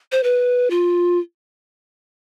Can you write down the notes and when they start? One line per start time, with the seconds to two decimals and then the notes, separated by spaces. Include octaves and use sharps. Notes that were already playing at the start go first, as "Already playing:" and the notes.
0.12 C5
0.23 B4
0.70 F4